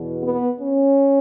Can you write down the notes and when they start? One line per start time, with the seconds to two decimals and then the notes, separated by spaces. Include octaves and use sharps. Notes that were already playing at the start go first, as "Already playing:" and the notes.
Already playing: E2 B2
0.22 B3
0.59 C#4